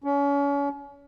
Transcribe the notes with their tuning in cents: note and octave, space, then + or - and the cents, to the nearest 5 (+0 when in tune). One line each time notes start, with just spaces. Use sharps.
C#4 +35